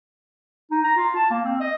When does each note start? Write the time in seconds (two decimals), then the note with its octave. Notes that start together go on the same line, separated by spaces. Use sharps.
0.71 D#4
0.85 A#5
0.96 F4
1.16 A5
1.30 A#3
1.45 C4
1.60 D#5